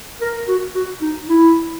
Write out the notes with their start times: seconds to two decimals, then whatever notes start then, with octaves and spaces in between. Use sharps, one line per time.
0.21 A#4
0.48 F#4
0.75 F#4
1.01 D#4
1.28 E4